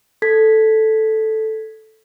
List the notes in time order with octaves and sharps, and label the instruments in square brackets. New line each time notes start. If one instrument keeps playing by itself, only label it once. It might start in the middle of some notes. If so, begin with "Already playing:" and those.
[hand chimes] A4 G#6 B6